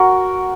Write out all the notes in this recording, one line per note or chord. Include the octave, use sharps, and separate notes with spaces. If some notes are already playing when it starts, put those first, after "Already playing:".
Already playing: F#4 A#4